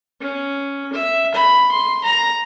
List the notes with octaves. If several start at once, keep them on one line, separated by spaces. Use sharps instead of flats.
C#4
E5
B5
C6
A#5